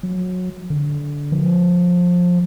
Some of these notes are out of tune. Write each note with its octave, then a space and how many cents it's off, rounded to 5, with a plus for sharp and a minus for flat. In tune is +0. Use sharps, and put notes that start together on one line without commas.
F#3 -20
D3 -15
F3 +20